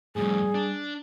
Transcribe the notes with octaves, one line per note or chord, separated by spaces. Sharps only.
F2 A2 G3 G#4
D4